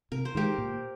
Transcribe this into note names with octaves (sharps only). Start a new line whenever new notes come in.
C3 A#4
C5
D#3 G#3 G4 A#4
A#2